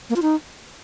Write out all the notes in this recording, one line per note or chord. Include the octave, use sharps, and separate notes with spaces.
A#3
F4
D#4